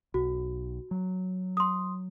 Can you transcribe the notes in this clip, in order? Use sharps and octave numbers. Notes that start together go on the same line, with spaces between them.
B1 F#4
F#3
C6 D#6